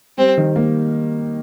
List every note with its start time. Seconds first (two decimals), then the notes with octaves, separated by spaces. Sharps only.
0.18 G3 C4
0.37 D#3
0.56 A#3